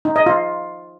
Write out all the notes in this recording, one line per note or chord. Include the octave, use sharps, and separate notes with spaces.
D#4
D#5
F4